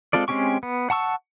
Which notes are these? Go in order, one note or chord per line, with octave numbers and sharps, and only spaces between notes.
G#3 C4 F4 A4 D5
G#3 C4 C#4 G4 C#6
B3
F#5 A5 C#6 E6